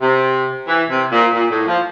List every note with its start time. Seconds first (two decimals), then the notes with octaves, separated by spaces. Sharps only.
0.02 C3
0.68 E3
0.90 C3
1.12 A#2
1.34 A#2
1.50 A2
1.67 F3